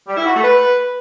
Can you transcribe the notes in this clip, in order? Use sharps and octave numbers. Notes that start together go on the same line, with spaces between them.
G3
E4
F#4
A3
B4